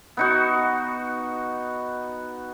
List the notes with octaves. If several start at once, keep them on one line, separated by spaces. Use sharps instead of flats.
B3 D#4 F#4